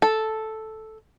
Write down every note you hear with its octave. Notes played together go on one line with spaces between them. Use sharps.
A4